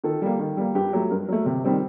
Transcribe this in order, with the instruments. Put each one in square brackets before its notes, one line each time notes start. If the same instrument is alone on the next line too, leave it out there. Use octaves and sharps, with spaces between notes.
[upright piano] D#3 A4
G3 A#3
D#3
G3 A#3
G2 G4
F#3 A3
G2 A#4
F#3 A3
C3
D#3 G3 C4